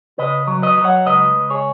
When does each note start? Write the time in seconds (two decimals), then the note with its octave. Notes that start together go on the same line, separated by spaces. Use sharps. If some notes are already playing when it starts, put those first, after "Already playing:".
0.18 C#3 B4 D#5
0.47 F#3
0.62 B4 D#5
0.78 F#3
0.84 C#5 F#5
1.06 C#2 B4 D#5
1.36 C#2
1.50 G#4 C#5